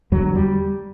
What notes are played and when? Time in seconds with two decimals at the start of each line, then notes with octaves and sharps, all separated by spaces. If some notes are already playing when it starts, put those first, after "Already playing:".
0.12 E2 D3 F#3
0.35 G3